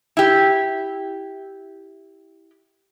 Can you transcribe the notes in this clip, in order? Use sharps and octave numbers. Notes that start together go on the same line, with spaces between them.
E4 G4